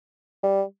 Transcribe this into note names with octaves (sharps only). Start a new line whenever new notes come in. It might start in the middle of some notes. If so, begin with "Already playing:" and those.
G3